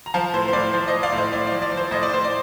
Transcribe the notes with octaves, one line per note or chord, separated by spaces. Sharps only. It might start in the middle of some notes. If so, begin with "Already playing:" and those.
A#5
F3 F5 A5
A2 C5
C5
A2 D5
F3 C5
C5 D#5
F3
D5 F5
A2
C5 D#5
A2 D5
F3 D5
D5
F3
C5
A2 D#5
D5
A2 C5
D5